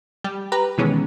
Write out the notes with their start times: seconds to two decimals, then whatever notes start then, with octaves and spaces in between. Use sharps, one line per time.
0.24 G3 G4
0.52 G4 B4 A#5
0.78 B2 D#3 E3 G#3 B3 C#4